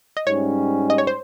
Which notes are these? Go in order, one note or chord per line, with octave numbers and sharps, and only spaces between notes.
D#5
G#2 G3 C#4 C#5
D#5
C#5
C5